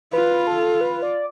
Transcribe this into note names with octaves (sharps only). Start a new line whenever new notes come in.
F4 B4
A4
B4
D5